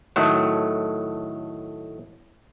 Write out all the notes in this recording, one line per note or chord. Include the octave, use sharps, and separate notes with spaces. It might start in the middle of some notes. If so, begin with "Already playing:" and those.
A2 D#3 F#3 A3